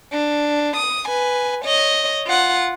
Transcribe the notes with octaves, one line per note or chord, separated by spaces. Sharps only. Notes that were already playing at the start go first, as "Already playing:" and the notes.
D4
D#6
B4 G#5
C#5 D#5
F4 F#5